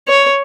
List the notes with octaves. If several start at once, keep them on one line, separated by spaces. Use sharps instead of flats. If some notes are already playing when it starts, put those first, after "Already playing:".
C#5